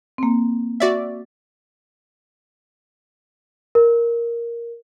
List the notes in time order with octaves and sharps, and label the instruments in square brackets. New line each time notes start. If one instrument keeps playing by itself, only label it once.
[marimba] A#3 C4
[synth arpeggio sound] F#4 D5 E5
[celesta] A#4